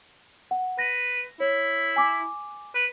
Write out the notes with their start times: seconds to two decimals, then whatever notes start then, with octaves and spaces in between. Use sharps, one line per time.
0.51 F#5
0.79 B4 A#6
1.40 E4 C#5
1.96 G#5 D6
2.74 B4